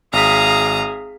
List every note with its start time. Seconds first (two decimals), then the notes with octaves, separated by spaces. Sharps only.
0.13 G#1 G#4 F5 A#5 D#6 B6